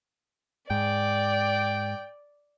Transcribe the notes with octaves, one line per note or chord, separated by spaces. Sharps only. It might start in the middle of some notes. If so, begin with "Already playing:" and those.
G#2 D5 G5